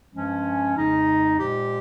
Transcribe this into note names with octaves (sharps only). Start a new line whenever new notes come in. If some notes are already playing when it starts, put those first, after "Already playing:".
G2 F3 G#3 C#4
F2 C#3 G#3 D#4
A#2 F3 G#3 G4